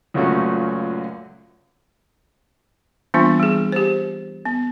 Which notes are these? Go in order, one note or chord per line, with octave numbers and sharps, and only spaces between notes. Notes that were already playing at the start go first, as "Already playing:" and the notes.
C#2 F#2 A#2 A3 C#4 F#4
E3 G3 A#3 B3 D4 F4
G3 G#4
G4 C5
B3